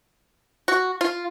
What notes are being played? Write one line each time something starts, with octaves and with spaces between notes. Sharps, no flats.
F#4
F4